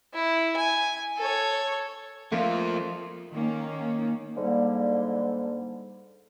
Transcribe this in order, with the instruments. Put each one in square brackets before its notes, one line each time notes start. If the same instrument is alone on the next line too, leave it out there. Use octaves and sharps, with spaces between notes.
[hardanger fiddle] E4
G#5
A4 C#5
[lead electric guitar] F2 F3 [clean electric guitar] A3 A#3 F4
[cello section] D#3 A#3 C#4
[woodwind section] G#2 D3 G3 A#3